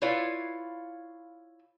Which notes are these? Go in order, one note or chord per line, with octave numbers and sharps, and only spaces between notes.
E4 F4 B4 C#5 D5 F5